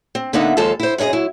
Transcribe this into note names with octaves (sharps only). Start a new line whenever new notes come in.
C4
D3 A#3 B3 D#4 E5 F#5
D#2 F3 G#3 A4 F5 A5
E4 C5
F#2 C#4 D4 G#4 D#5
F#3 E4